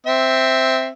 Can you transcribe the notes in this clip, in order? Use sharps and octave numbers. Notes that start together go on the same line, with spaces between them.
C4 E5